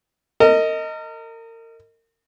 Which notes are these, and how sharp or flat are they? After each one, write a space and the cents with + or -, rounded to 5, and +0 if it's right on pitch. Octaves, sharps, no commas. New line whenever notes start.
A#4 -35 D#5 +10